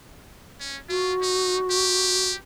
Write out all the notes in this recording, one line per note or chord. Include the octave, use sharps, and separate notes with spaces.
C#4
F4 F#4
D#4
G4